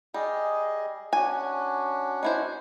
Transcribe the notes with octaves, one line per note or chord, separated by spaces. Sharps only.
G3 G#4 D#5
C#4 D4 F#4 G#5
D#4 E4 C5